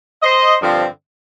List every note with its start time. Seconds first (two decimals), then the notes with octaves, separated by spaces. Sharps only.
0.23 C5 D#5
0.59 G2 D3 F3 C4